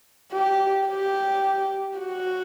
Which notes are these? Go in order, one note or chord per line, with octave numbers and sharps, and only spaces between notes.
G4
G4
F#4